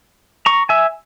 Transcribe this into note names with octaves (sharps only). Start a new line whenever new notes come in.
A#5 C#6
E5 G#5